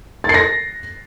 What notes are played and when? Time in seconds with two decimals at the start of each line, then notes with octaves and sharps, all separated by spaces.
0.24 A6
0.29 C7
0.34 A#6